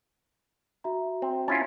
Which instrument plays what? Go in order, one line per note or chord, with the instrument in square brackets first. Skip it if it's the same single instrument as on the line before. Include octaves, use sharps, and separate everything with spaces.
[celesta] F#4 E5 A#5
[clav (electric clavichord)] C4
[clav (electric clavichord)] C#4 E4 F4 [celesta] A6